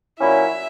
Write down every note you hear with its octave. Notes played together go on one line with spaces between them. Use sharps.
A#2 F#3 C#4 E4 E5